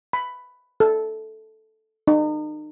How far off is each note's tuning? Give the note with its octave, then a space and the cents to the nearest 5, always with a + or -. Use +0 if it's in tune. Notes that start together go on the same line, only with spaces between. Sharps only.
B5 +10
A4 -5
D#4 -40